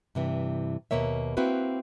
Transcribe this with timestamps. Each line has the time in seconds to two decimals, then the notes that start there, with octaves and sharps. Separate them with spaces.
0.15 G2 C3 E3
0.91 D#2 B2 A#3 C#5 E5
1.37 A#3 C4 E4 F#4 B4